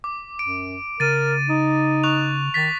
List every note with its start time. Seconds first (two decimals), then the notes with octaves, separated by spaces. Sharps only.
0.04 D6
0.39 F#2 D7
1.00 C#3 A#4 A6 D#7
1.49 D#4
2.04 C#6 F#6 F7
2.54 D#3 A6 B6